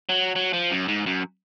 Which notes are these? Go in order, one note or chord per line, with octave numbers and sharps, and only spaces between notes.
F#3
F#3
F3
F#2
G#2
F#2